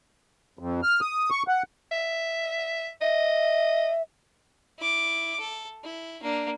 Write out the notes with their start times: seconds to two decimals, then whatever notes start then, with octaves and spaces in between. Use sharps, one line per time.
0.59 F2
0.83 F6
1.01 D#6
1.30 C#6
1.48 F#5
1.91 E5
3.01 D#5 E5
4.79 E4 D6
5.40 A4
5.84 E4
6.23 A#3 D4